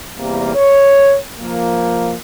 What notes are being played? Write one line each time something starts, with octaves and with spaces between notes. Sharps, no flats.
E2 C3 G3 A#3
C#5
F3 A#3